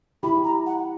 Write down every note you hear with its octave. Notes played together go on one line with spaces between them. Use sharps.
E4 G4 B5
A#5
F#5